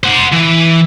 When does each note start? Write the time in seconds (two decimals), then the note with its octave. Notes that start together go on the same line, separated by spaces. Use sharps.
0.04 C5 F#5
0.32 E3